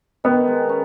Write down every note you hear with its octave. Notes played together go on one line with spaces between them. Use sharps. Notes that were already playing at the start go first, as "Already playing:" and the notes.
D#3 B3
G#3
C#4